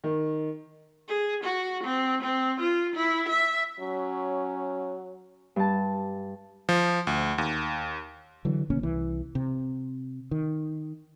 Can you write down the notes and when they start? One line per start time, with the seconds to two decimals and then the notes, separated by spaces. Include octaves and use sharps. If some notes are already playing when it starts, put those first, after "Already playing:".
0.04 D#3
1.08 G#4
1.43 F#4
1.83 C4
2.22 C4
2.60 F4
2.95 E4
3.28 E5
3.80 F#3 C#4
5.56 G2 A5
6.69 F3
7.07 D2
7.38 D#2
8.45 D3 E3 F#3
8.70 A1 C#3 A#3 C#4
8.83 C2 E3
9.35 C3
10.31 D#3